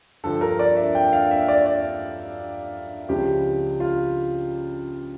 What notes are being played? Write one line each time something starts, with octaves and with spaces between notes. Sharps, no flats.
G2 D3 F3 A4
A#4
D5
E5
G5
F5
E5
D5
D5
C#2 C#3 F3 G4
F4